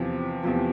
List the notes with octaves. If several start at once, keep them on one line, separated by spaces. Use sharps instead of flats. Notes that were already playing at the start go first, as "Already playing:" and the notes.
Already playing: E2 C3 F3
E2 C3 F3